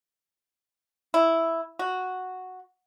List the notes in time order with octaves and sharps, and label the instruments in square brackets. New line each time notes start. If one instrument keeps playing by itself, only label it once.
[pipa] E4
F#4